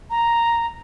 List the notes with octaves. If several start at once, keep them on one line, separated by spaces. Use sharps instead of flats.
A#5